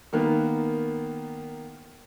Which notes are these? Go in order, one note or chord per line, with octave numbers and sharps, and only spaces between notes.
D#3 A#3 B3